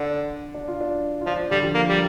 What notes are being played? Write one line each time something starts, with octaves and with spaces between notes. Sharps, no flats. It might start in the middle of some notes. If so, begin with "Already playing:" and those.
Already playing: D3 D4
D4
F4
D4
F4
F3 D4
D3 G3
F3
A#3
G3